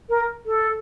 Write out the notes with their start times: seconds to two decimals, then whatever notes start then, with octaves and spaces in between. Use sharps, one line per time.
0.09 A#4
0.46 A4